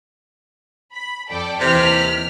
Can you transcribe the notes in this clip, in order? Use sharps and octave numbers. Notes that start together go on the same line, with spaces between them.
B5
F2 A4 D5 G5
D#2 C3 E3 F6 B6